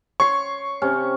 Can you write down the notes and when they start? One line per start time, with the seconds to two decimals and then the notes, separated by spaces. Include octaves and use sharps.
0.20 C#5 C6 C#6
0.82 C3 C#4